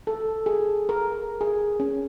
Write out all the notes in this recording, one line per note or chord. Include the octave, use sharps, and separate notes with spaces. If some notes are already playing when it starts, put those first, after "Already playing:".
A4
G#4
A#4
G#4
C#4